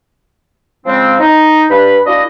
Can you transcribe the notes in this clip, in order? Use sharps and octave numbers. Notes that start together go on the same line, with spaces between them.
C#3 F3 G#3 C4
D#4
G2 B4 B5
A#3 D4 E4 F#4 D#5